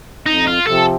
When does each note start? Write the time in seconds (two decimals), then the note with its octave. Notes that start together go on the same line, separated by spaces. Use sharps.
0.26 F2 D#4
0.47 F4
0.67 C3 F3 C4 A4